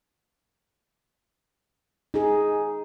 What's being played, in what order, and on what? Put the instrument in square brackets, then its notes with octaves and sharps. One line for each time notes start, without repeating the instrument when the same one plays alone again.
[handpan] D#4 G#4